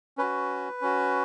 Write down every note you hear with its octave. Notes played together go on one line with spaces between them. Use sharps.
C#4 F#4 B4
C#4 F#4